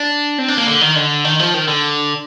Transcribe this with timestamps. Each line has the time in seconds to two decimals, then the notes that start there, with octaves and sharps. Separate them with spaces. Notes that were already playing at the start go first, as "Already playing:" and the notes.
Already playing: D4
0.38 C4
0.48 D4
0.57 A#3
0.67 D3
0.81 D#3
0.96 D3
1.25 D#3
1.39 F3
1.54 D#3
1.68 D3